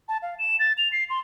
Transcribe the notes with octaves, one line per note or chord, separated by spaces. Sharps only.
A5
F5
E7
A6
F7
C7
C6